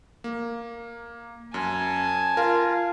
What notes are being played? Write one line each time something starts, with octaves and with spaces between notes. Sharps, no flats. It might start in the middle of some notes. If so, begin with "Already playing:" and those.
A#3
F#2 G#5 A5
F4 A#4